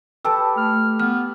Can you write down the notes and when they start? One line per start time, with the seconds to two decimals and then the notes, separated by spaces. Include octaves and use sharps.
0.25 G4 A4 B4 A5 E6
0.57 A3 F6
1.00 B3 F6